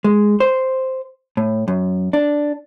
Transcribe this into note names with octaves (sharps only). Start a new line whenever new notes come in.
G#3
C5
A2
F#2
D4